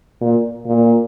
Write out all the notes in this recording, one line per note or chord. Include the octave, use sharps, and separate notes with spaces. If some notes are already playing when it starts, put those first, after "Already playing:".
A#2
A#2